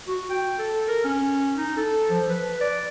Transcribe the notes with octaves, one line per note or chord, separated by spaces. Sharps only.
F#4
G5
A4
A#4
C#4
D#4
A4
F3
B4
D5